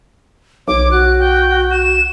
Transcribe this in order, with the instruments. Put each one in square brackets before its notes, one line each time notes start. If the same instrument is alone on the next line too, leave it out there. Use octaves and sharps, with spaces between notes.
[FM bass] B1 [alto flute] C#5 [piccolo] D6
[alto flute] F#4 [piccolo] F#6
[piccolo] G5
E7